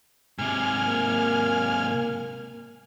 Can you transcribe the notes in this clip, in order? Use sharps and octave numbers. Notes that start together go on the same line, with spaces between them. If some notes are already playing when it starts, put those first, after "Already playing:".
G#2 C3 G#5 F6
A#3